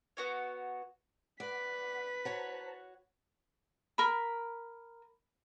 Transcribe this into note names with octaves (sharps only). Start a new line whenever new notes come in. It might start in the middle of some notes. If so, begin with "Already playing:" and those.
B3 F#4 C#5
B4 D5 F#5 B6
F#4 C5 C#5 F#5 A5 A#5
A#4 B5